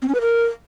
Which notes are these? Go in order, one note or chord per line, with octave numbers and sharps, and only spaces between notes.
C4
C#4
B4
A#4